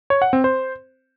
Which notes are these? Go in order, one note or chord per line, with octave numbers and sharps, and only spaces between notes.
C#5
F#5
C4
C5